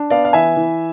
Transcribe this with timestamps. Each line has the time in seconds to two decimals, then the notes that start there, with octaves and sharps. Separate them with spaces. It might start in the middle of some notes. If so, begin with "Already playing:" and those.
Already playing: D4
0.10 B3 D5 F5
0.25 F5
0.33 E3 E5 G#5
0.57 E3